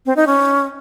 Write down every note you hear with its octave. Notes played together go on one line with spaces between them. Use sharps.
C4
D#4
C#4